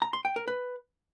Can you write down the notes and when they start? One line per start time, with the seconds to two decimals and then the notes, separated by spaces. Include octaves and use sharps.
0.02 A#5
0.13 C6
0.25 G5
0.36 A#4
0.48 B4